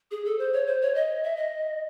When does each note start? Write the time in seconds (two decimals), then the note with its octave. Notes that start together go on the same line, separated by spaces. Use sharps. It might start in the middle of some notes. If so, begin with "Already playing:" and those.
0.11 G#4
0.25 A4
0.38 C5
0.53 C#5
0.67 C5
0.81 C#5
0.95 D#5
1.23 E5
1.36 D#5